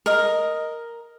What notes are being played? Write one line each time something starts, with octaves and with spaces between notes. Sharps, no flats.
A#4 D#5